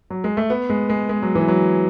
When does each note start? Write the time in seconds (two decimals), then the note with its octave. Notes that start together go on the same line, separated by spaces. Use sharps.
0.10 F#3
0.24 G#3
0.37 A3
0.50 B3
0.70 G#3
0.90 G#3
1.09 G#3
1.22 F#3
1.35 E3
1.48 F#3